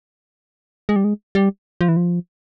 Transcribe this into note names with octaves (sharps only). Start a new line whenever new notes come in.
G#3
G3
G#3
G3
F3
E3
F3